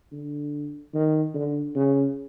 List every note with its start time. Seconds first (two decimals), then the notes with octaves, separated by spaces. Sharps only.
0.12 D3
0.94 D#3
1.34 D3
1.75 C#3